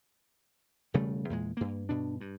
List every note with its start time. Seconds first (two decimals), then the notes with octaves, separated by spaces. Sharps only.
0.94 E1 C#3 G3 A3
1.30 E2 A#2 G#3
1.57 G2 A#3
1.89 G2 B2 D4
2.21 G2